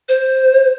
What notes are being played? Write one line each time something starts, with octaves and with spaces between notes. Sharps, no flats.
C5